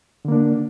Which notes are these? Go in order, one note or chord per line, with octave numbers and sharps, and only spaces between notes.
D3 A#3 D4